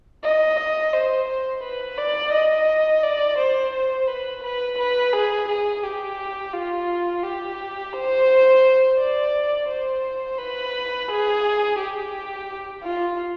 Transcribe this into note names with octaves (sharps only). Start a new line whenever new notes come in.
D#5
C5
C5
B4
D5
D#5
D5
C5
C5
B4
B4
B4
G#4
G#4
G4
F4
G4
C5
D5
C5
B4
G#4
G4
F4